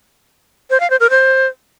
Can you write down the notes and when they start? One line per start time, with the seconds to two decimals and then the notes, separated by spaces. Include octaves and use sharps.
0.70 C5
0.80 F5
0.90 C5
1.00 A#4
1.10 C5